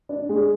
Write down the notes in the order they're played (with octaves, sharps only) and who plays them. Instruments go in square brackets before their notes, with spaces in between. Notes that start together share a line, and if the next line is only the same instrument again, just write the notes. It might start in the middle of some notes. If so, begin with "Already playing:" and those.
[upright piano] D4
G#3